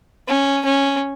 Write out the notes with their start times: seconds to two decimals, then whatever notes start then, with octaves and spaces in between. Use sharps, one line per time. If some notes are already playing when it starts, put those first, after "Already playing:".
0.28 C#4
0.65 C#4